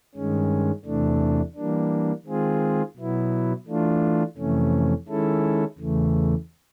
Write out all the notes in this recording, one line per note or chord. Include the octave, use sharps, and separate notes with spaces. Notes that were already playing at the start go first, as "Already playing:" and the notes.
G2 D#3 G#3 C#4
E2 C3 E3 A3 D4
E3 G3 A#3 D4
D#3 G#3 C4 F4 G#4
B2 F#3 B3 E4
E3 A3 D4 F4
F2 C3 E3 A3 C#4
D#3 G#3 C#4 E4 A4
E2 C#3 E3 A3